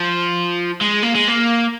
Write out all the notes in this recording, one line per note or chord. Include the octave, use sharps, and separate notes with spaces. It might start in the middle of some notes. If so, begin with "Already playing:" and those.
Already playing: F3
G#3
A#3
G#3
A#3